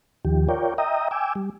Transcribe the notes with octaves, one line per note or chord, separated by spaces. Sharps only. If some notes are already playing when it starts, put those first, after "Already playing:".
D#2 D#3 F3 G4
F4 A#4 C#5 D5 G5
D#5 E5 G5 A#5 D#6
G5 G#5 D6 E6
G3